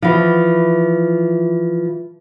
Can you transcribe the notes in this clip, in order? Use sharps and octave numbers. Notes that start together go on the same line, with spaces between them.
E3 F3